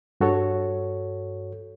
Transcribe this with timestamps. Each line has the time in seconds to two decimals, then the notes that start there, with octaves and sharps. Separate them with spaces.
0.21 G2 F#4 A4 C#5